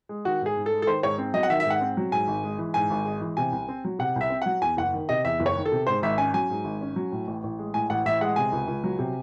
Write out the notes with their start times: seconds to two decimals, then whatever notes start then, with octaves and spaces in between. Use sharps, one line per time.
0.09 G#3
0.25 D#3 F#4
0.41 G#2 G#4
0.57 G#2
0.66 A4
0.72 G#3
0.82 A4
0.87 D#3 C5
1.03 G#2 C#5
1.18 C4
1.34 F#3 D#5
1.43 F#5
1.50 D#3 E5
1.60 G#2 E5
1.70 F#5
1.81 C4
1.97 F#3
2.12 G#2 G#5
2.28 G#1
2.44 G#3
2.59 E3
2.74 G#2 G#5
2.90 G#1
3.05 G#3
3.21 E3
3.37 C3 G#5
3.52 C2
3.69 C4
3.85 F#3
3.99 C3 F#5
4.16 C2
4.21 E5
4.30 C4
4.42 F#3 F#5
4.61 E2 G#5
4.77 F#1 F#5
4.94 D#3
5.09 C3 D#5
5.24 E2 E5
5.40 F#1
5.46 C#5
5.56 D#3
5.66 A4
5.72 C3
5.87 G#2 C5
6.03 G#1 E5
6.18 C#4 G#5
6.34 F#3 G#5
6.50 G#2
6.64 G#1
6.81 C#4
6.96 F#3
7.12 A2
7.27 A1
7.43 A1
7.59 G#3
7.74 A2 G#5
7.90 A1 F#5
8.05 A1 E5
8.21 G#3 F#5
8.36 C3 G#5
8.52 C#2
8.68 C#2
8.84 F#3
8.99 C3